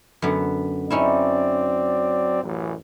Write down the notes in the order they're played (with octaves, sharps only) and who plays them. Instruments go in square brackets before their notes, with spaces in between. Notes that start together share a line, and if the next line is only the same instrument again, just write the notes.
[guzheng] F#2 D3 B3
[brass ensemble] F#3 C4 D5 [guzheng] C#4 D#4 E4
[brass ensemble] A1 F#2